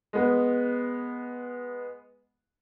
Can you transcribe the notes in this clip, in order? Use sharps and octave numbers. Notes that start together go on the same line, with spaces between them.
G#3 B3